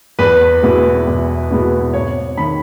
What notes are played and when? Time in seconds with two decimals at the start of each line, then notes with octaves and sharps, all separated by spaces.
0.19 E2 B4
0.62 B2 G#3 B3 E4
1.07 E2
1.50 B2 G#3 B3 E4
1.93 G#1 C#5
2.37 D#3 B5